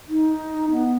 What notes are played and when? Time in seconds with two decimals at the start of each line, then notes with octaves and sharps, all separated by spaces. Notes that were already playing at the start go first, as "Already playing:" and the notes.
0.09 D#4
0.72 B3